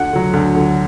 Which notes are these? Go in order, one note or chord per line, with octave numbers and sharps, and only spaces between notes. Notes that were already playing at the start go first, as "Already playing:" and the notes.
Already playing: D2 F#5
D3 F#3
D2
D3 F#3